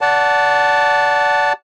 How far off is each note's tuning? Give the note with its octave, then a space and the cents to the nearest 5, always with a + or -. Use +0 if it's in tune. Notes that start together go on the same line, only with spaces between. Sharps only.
D5 -25 F#5 +0 A5 +0